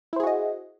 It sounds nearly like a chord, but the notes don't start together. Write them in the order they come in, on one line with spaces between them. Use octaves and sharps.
E4 C5 G#4 F#4 D#5